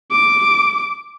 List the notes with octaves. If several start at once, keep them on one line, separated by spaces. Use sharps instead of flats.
D6